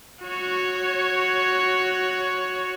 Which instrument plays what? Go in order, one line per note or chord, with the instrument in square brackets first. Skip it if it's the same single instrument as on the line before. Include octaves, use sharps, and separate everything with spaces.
[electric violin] F#4 C#5